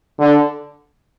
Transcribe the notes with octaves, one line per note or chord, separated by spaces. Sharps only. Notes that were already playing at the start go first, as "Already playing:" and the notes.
D3